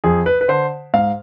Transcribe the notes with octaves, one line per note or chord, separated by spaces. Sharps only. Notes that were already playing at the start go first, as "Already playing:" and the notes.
F2 G#4
B4
B4
D3 C5
G#2 F5